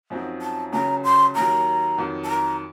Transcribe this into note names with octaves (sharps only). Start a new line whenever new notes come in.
F#2 F3 C4 D#4 F#4
A5
C#2 C#3 F#3 A#5
C6
D#2 D#3 F#3 A#5
F2 D#3 F#3
A5
A#5